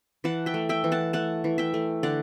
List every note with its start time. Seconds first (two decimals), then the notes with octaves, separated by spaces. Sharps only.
0.24 E3 F#5 A5
0.46 E5 G5
0.54 A3
0.69 E5 G5
0.84 E3
0.92 F#5 A5
1.13 A3 F#5 A5
1.44 E3
1.58 E5 G5
1.74 A3
2.03 D3 D5 F#5